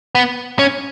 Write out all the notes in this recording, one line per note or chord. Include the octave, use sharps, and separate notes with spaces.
B3
C#4